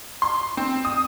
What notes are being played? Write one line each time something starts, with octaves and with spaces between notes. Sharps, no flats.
C6
C4
D#6